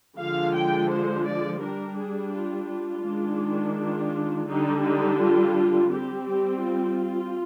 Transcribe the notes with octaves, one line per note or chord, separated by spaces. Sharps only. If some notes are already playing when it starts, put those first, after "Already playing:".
D3 F3 G#3 F5
G5
C5
D5
G3 D4 A#4
G#4
F4
F4
D#3 G#3 D4
F4
D3 G3 D4 D#4
D#4
F4
G3 C4 G4
G4
F4